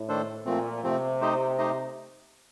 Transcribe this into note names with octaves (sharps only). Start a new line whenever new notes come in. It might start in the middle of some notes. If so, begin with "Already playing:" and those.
Already playing: A2
D#3 A3 D4 A4 C5
A#2 F3 A3 C4
C3 F3 A3 C4
A3 D#4 G4 C5 D#5
A3 D#4 G4 C5 D#5